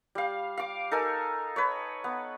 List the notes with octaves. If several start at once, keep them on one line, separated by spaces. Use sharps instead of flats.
G3 F5
F5 D6
D#4 A4 A#4 G#5
B4 C#5
B3